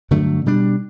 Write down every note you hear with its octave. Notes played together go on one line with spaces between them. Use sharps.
G2 D3 F#3 A3
B2 G3 D4